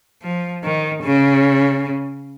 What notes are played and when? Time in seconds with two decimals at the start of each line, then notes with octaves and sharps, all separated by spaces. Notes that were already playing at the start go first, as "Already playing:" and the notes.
0.22 F3
0.63 D#3
1.03 C#3